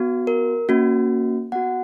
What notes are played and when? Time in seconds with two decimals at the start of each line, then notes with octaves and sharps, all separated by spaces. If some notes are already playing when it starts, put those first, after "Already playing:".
Already playing: B3 F#4
0.27 A#4
0.69 A#3 C#4 F#4
1.52 B3 F#4 F#5